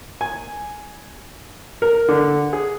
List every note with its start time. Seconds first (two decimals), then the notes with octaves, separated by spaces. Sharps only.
0.21 G#5
1.82 A#4
2.08 D3
2.53 G#4